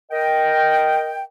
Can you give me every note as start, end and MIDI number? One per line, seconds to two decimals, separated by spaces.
0.11 1.23 70
0.11 1.23 75
0.11 1.23 79